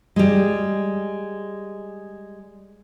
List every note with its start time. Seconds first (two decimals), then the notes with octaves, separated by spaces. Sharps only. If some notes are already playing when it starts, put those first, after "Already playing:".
0.16 G3 G#3